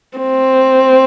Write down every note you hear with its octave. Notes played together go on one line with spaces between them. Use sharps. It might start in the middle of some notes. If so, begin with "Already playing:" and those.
C4